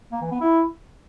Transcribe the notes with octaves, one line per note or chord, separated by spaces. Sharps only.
A#3
E3
B3
E4